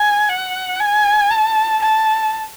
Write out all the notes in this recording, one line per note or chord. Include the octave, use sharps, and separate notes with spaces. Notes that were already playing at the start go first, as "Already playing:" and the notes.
Already playing: G#5
F#5
G#5
A5
A5